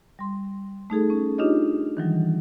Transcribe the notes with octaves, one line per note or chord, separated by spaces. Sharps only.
G3 C6
A3 D#4 G#4 A4
C#4
D4 D#4 F4 G4 C#5 D#5
D#3 E3 F#3 G3